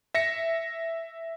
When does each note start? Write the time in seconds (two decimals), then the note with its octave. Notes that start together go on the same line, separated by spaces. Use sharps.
0.15 E5 A#6 C#7